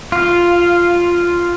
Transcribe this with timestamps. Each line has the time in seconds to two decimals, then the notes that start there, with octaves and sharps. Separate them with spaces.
0.12 F4